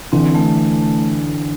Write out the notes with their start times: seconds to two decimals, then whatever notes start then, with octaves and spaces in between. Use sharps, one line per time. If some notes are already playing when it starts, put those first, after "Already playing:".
0.12 D3 E3 C4
0.35 A3
0.59 A3
0.81 A3